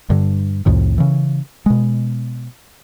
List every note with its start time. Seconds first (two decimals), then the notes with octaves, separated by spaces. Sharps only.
0.10 G2 D3
0.66 C2 F2 A2 D#3
0.98 C#3 E3
1.66 B2 G#3